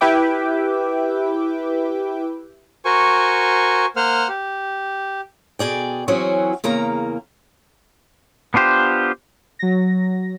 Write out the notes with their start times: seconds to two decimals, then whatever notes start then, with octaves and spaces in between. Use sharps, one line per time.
0.01 E4 G4 B4 E5 G5 D6
2.84 F#4 A#4 C5 G#5 C#6
3.96 A#3 C5 F#5 F6
4.29 G4
5.59 B2 G#4 D5 G5
6.08 E3 F#3 C4 C#4 F#4 G#4
6.64 E2 C#3 A#3 A#5
8.54 B3 D4 F4 G4 C5
9.59 F#3 A#6